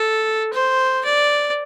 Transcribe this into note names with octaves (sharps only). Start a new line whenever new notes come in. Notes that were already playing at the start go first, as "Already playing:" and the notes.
Already playing: A4
C5
D5